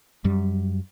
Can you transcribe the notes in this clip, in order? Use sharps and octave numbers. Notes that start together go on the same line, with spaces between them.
F#2 G3